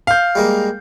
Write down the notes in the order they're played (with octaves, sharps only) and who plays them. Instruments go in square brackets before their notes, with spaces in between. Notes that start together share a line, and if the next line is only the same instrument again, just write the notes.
[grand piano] F5 G6
[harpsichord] G3 G#3 A#3